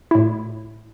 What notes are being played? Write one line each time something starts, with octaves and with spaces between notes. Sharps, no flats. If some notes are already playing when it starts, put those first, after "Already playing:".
A2 E4